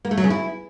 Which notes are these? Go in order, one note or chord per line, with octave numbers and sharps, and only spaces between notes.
A#3
A3
F#3
C#3
E4